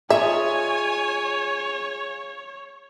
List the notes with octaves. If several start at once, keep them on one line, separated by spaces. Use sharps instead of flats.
F4 G#4 C#5 D#5 E5 G#5